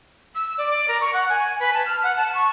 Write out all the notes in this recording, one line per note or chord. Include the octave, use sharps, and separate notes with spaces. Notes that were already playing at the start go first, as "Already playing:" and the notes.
E6
D5
A#4
C#6
F#5
G#5
B4
A5
F6
F#5
A5
C#6